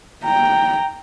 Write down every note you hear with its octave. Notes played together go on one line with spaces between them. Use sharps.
G5 A#5